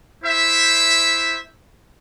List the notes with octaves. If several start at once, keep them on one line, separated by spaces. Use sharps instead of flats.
E4 C5 E5